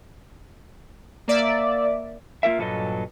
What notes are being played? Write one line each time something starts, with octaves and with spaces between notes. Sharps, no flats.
A#3 D5 E5
A#3 F4 A#4 E5
G2 A#2 F#3 A4 B4 D#5